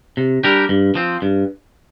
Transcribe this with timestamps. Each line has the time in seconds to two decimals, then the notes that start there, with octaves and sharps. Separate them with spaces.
0.17 C3
0.44 G3 D4 G4 A#4
0.69 G2
0.95 F3 C4
1.22 G2